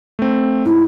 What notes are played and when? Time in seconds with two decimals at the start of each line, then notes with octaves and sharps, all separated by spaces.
0.19 A3 C4
0.66 G#2 E4